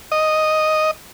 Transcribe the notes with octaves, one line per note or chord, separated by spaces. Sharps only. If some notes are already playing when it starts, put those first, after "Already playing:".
D#5